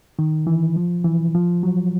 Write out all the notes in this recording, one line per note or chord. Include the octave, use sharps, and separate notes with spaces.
D#3
E3
F3
E3
F3
F#3